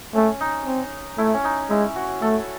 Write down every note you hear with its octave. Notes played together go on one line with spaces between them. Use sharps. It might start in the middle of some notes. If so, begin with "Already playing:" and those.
A3 C#4
D#4
C4
A3 E4
C#4
D#4
G#3 E4
F#4
A3 A4